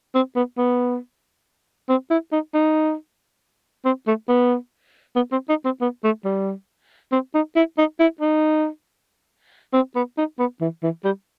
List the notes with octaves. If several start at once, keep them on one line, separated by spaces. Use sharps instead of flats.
C4
B3
B3
C4
E4
D#4
D#4
C4
A3
B3
B3
C4
D#4
C4
B3
A3
G3
C4
D#4
E4
D#4
E4
D#4
C4
B3
D#4
B3
E3
E3
G3